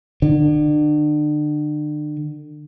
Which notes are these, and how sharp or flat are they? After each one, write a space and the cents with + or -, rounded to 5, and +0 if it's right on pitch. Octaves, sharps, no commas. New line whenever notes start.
D3 +35